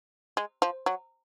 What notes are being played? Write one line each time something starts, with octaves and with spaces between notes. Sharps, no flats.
G#3
F3
F#3